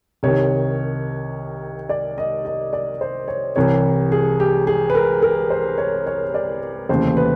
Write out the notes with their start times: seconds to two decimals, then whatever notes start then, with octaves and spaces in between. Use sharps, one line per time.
0.23 C2 C3 D#3 C#5
1.89 D5
2.18 D#5
2.45 D#5
2.73 D5
3.01 C5
3.28 C#5
3.56 C2 C3 E3 C#5
4.12 G#4
4.40 G4
4.67 G#4
4.90 B4
4.95 A#4
5.23 A#4
5.50 C5
5.78 C#5
6.06 C#5
6.34 D5
6.89 F1 D#2 C#3 E3 C5
7.17 B4